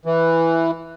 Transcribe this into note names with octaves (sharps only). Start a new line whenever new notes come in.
E3